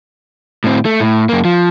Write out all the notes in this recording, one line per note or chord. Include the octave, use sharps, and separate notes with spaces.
A2 C4
A3
A2
F#2 A#3
F3